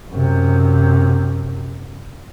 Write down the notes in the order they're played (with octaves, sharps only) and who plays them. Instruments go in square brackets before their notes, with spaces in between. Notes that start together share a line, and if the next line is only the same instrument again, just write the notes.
[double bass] F#2 C3